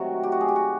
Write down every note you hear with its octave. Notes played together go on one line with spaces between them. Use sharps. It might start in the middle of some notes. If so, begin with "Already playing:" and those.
Already playing: C3 D#3 F#3 A3 F#4
G4
F#4
G#4
G4
F#4